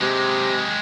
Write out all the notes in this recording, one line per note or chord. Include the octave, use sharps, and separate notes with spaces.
C3 G#3 G4